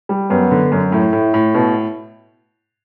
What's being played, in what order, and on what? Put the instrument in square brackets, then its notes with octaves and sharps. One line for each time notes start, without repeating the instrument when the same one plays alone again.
[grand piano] G3
[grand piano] F#2 [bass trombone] B3
[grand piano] D3
F#2
[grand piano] A2 [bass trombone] A3
[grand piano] A2
A2
B2